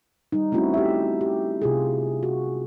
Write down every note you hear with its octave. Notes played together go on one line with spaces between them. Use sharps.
G3 D#4
A3 C4 C#4 E4 F#4
G4 E5
G4
C3 F4 G#4
F#4